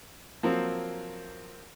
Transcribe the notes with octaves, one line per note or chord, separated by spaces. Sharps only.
F3 F#3 A#3 C4